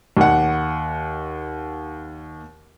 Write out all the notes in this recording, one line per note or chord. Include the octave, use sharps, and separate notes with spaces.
D#2 F#5